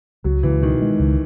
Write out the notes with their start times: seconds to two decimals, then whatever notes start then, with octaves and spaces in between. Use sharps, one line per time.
0.24 C#2 F#3
0.43 C#2 E3
0.63 B2 D#3
0.82 G#3
0.99 C#2